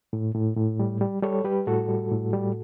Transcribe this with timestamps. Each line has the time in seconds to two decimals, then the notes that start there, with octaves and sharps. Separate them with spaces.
0.13 A2
0.35 A2
0.57 A2
0.80 G3
1.01 G3
1.22 G3 A4 C#5
1.44 G3 G4 B4
1.67 A2 F#4 A4
1.88 G3
2.11 A2
2.33 G3